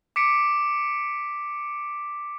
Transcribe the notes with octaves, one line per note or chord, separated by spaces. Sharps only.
D6 B6 C#7 D7